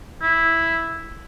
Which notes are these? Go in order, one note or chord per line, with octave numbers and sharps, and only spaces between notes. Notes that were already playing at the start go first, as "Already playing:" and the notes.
E4